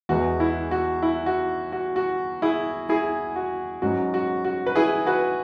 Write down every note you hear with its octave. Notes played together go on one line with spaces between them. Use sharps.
E2 E3 G#3 B3 F#4
E4
F#4
E4
F#4
F#4
F#4
E4 G#4
E4 G#4
F#4
G#2 F#3 C#4 F#4
F#4
F#4
B4
E4 G#4
F#4 B4